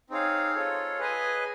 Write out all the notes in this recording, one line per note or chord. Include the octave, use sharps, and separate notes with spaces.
C4 D#4 G#4 C#5 F5
F4 A4 C#5
G#4 B4 D#5 G#5